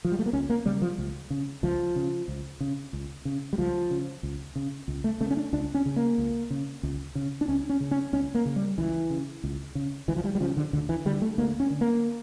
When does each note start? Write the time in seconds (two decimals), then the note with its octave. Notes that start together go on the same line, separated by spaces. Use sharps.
0.05 F3
0.12 G3
0.19 A3
0.26 A#3
0.33 C#2 C#4
0.50 A#3
0.66 C#3 G3
0.82 F3
0.98 C#2
1.30 C#3
1.63 C#2 F3
1.96 C#3
2.28 C#2
2.60 C#3
2.93 C#2
3.25 C#3
3.53 G3
3.58 C#2 F3
3.91 C#3
4.23 C#2
4.56 C#3
4.88 C#2
5.04 A3
5.20 C#3 A3
5.31 C#4
5.37 D4
5.53 C#2 D4
5.74 C#4
5.86 C#3
5.96 A#3
6.18 C#2
6.50 C#3
6.83 C#2
7.15 C#3
7.41 D4
7.48 C#2 C#4
7.69 C#4
7.80 C#3
7.91 C#4
8.13 C#2 C#4
8.35 A#3
8.46 C#3
8.56 G3
8.78 C#2 E3
9.10 C#3
9.44 C#2
9.75 C#3
10.08 C#2 E3
10.17 F3
10.24 G3
10.35 G3
10.40 C#3 F3
10.57 D3
10.73 D2 D3
10.89 E3
11.05 D3 G3
11.22 A3
11.38 D2 A#3
11.60 C#4
11.70 D3
11.81 A#3